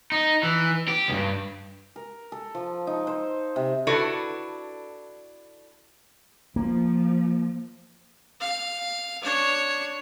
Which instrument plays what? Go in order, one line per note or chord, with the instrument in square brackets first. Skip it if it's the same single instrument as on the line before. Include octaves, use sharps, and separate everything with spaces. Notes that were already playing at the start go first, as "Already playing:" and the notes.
[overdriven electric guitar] D#4
E3
G4
C#2 G2
[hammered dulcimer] A#4
A4
F3
D#4
C5
C3
[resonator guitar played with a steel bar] D4 E4 F#4 A4 B4 D5
[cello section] F3 [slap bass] A#3
[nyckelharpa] F5
D4 C#5